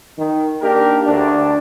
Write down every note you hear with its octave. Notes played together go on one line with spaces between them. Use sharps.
D#3
A#3 D4 D#4 G4 A#4
D2 D4